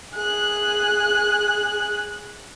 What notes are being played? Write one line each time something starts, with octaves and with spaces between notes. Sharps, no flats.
G#4 F#6